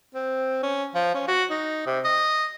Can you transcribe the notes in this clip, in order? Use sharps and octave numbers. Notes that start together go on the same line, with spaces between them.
C4
C#4
F3
C#4
F#4
D#4
C3
D#5